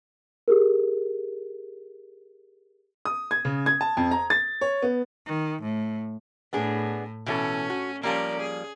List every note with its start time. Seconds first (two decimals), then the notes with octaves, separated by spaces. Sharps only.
0.48 G4 G#4 A#4
3.05 D#6
3.31 G#6
3.45 C#3
3.66 G#6
3.81 A5
3.97 F2
4.11 A#5
4.30 A6
4.61 C#5
4.82 B3
5.26 D#3
5.62 A2
6.53 A2 B3 D4 G#4
7.26 B2 E3 C#4 A4
7.70 F#4
8.03 F3 G3 A#3 C#4 A#4 D5
8.40 G#4